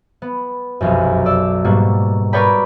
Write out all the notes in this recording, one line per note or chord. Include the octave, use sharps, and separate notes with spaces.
B3
F1 B1 F#2
A4 D5 E6
G#2 B2 G3 A#3 F#4
A#4 B4 C#5 D5 G5 B5